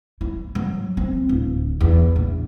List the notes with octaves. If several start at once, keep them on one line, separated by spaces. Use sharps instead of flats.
E4
F#3
C4
D1
E2
A#1